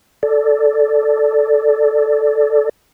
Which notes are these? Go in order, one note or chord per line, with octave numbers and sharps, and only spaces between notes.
A4 D5